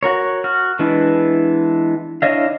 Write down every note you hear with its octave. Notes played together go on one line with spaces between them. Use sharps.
F#4 A#4 C#5
F#4 F6
E3 G#3 B3 D4 E4
D4 E4 C#5 D#5 F5